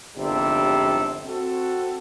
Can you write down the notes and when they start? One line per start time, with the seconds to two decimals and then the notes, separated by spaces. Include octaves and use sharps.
0.17 G1 F2 G#2 C3 G3 A4
1.26 C4 F#4 A4